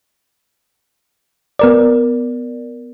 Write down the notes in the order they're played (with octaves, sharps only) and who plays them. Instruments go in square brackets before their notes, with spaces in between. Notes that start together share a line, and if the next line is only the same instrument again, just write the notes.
[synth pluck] B3 A#4 D5